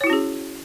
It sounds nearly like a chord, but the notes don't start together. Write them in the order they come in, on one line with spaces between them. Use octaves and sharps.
C#5 E4 F#4 C#4 G#4